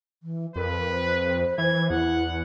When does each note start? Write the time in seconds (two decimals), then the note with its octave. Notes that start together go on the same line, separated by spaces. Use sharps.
0.23 E3
0.56 F2 A#4 B4
0.92 C5
1.58 E3 G#6
1.90 E2 E4 F#5